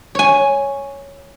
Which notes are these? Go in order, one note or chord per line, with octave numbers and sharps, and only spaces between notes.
C#5 G#5